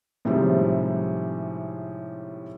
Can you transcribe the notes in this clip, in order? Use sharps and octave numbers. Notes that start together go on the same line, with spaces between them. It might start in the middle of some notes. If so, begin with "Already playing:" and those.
A2 C3 D#3 F3 G3 G#3